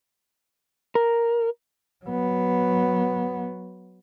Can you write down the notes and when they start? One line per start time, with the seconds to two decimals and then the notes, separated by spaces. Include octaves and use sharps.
0.95 A#4
2.05 F#3 B3